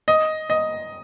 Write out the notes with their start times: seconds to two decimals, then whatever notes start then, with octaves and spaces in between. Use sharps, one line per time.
0.08 D#5
0.50 D#5